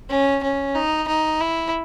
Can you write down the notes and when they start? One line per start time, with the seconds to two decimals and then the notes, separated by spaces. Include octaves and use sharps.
0.09 C#4
0.43 C#4
0.75 D#4
1.08 D#4
1.40 E4